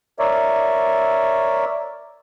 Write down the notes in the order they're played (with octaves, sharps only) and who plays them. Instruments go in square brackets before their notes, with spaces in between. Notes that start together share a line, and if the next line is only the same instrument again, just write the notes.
[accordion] A#4 C#5 D5 E5